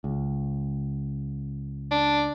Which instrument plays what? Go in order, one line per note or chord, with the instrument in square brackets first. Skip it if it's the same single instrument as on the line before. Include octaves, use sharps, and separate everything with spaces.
[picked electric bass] C#2
[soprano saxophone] D4